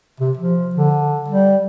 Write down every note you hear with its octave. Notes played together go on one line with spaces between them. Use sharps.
C3
F3
D3
G3